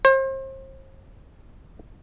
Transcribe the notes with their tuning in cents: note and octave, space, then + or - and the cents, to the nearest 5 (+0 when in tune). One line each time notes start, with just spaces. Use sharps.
C5 +35